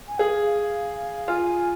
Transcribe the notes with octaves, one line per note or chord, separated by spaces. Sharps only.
G#5
G#4 F5
F5
F4 G#5